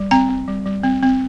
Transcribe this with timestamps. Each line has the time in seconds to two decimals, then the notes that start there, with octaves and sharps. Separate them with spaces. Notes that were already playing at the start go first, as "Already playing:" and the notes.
Already playing: G3
0.11 C4 A#5
0.29 C4
0.48 G3
0.65 G3
0.84 C4
1.03 C4